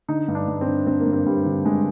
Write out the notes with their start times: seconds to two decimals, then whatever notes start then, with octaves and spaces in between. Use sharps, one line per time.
0.08 D3 D#4
0.28 G2
0.35 D4
0.48 G2
0.61 C4
0.67 D3
0.87 D3 C4
1.00 A#3
1.06 G2
1.13 C4
1.26 G2 G3
1.46 D3
1.65 D3 G#3